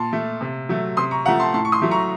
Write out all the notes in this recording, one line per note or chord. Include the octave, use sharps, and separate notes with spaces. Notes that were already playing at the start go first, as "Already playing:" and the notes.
Already playing: A#2 A5 C6
A3
C3
F#3 A3
C3 C6 D#6
A#5 C#6
F3 A3 F#5 A#5
A5 C6
A2 A5 C6
C#6
C6 D#6
F#3 A3
A#5 C#6